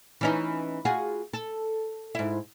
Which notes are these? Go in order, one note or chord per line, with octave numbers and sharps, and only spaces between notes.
E3 C#4 D#4
F4 F#4 G#4
A4
G#2 E4